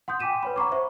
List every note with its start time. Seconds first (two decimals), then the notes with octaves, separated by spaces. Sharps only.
0.08 F#5 C6 D#6 G6
0.20 G5 G#5 D6 B6 D#7 E7
0.43 B4 C#5 B5
0.56 F#5 A#5 C#6 D6
0.71 C5 E5 B5 C#6